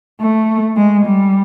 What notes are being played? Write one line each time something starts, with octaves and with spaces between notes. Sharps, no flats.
A3
G#3
G3